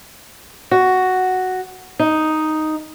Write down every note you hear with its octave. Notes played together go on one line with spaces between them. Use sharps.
F#4
D#4